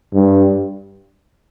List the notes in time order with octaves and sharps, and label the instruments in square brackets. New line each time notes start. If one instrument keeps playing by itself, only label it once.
[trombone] G2